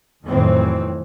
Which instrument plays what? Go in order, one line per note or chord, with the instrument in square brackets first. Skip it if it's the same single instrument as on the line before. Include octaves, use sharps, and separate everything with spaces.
[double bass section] F2 A2 D#3 E3 F#3 C4